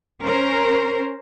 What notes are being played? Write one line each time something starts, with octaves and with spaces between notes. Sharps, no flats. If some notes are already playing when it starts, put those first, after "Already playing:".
C#4 A#4 C5